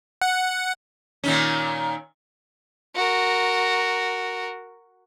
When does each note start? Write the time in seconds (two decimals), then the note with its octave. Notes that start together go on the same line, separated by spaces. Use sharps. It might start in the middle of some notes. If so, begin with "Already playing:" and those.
0.22 F#5
1.24 A#2 D#3 C#4
2.95 F#4 A#4